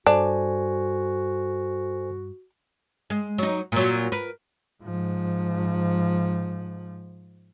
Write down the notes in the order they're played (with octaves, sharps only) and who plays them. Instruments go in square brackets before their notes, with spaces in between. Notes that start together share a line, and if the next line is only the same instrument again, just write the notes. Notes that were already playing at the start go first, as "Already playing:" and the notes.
[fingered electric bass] G2 [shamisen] D4 [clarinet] F#4 [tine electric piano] A4 C5 G#5
[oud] G#3
F#3 D#4
A#2 F#3
A#4 B4
[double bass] G#2 F3